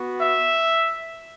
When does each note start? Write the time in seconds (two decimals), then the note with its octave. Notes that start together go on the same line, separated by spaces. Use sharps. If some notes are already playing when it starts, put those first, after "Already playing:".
Already playing: B3 F#4
0.20 E5